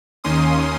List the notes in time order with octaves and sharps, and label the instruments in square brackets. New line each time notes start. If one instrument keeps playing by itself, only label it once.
[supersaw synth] D#2 D#3 A#3 C#4 C6 D#6